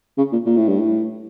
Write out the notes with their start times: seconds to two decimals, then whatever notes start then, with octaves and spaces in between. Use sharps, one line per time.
0.18 C#3
0.32 A#2
0.46 A#2
0.57 A2
0.68 G2
0.79 A2